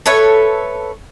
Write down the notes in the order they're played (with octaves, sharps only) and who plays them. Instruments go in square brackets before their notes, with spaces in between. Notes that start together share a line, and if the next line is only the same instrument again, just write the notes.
[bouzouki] A4 B4 C#5 E5